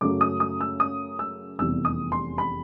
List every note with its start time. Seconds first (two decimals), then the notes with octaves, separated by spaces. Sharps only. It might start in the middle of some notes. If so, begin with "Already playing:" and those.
0.01 F#2 C#3 F#3 A3 D6
0.21 D#6
0.40 D#6
0.61 E6
0.80 D#6
1.19 E6
1.59 F1 E2 C3 E3 G3 E6
1.85 D#6
2.12 C6
2.38 B5